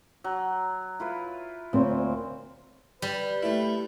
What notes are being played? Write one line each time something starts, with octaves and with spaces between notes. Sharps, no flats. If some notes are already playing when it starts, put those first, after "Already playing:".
F#3
E4 F4 B4
D2 A#2 C4 C#5
G3 B4
A3 E4